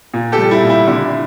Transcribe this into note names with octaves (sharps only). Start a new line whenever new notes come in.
A#2
G4 A4
G3
E4
A#2
E4
D3 E4